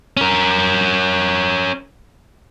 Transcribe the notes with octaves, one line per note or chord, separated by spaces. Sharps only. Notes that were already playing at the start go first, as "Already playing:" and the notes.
C#4 A#4